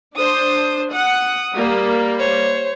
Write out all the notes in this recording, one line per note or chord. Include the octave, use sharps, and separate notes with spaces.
D4 C5 D#6
F#5 D#6
G3 A#3
C5 C#5